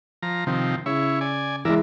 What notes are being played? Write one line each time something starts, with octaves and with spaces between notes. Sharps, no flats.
F3 A#5
C3 D#3 F3
C#3 E4 C#5
D5 G#5
E3 G#3 A#4 D5 E5